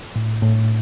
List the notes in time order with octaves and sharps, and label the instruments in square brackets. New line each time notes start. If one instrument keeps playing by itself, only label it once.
[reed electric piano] A2
A2